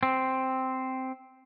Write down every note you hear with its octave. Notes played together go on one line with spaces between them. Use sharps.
C4